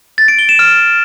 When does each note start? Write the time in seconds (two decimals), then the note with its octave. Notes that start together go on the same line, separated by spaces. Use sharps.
0.18 A6
0.28 D7
0.39 G7
0.49 E7
0.59 F6